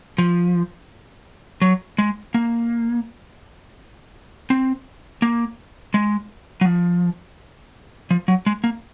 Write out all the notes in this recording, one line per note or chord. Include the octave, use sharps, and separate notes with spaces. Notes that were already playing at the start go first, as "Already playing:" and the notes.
F3
F#3
G#3
A#3
C4
A#3
G#3
F#3
F3
F3
F#3
G#3
A#3